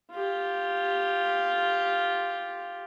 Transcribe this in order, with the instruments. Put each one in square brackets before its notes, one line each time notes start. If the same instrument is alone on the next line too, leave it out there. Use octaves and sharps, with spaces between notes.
[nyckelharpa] F4 G4